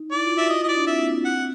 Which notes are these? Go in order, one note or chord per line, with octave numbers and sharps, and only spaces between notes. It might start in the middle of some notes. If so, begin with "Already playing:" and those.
Already playing: D#4
E4 D5
F4
F#4 E5
F4 D#5
E4 D#5
D5
D4
C4 E5
A#3
C4
C4 F#5